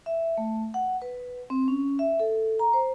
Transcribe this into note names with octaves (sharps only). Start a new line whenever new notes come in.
E5
A3
F#5
B4
C4
C#4
E5
A4
A#5
C5